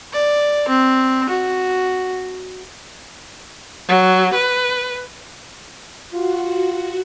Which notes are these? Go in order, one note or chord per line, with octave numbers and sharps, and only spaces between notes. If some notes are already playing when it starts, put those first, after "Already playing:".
D5
C4
F#4
F#3
B4
F4 F#4